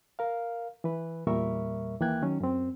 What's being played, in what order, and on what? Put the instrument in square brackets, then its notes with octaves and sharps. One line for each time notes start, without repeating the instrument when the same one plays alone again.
[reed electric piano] A#4 F5
E3 B4
E2 A#2 G3 A#4 E5 C#6
D#2 E3 A#3 G5 F#6 G#6
D#3 F#3 C#4
F#2 C4